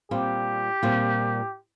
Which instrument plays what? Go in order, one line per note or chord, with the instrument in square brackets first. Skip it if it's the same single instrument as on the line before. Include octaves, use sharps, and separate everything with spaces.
[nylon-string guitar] A#2 G3 C4 F4 [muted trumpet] G4
[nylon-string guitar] A#2 G3 C4 F4